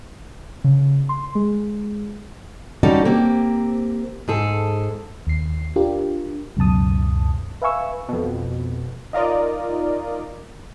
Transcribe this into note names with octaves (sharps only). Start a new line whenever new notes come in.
C#3
C6
G#3
G3 C#4 D#4 F#4 A4 D5
A#3 C4 G4
G#2 G#4 A4
D#2 C7
D4 F4 G4 A#4
C#2 F#2 B2 A5 D#6
B4 E5 F5 G#5 C#6 E6
F2 B2
D#4 F4 A#4 D5 D#5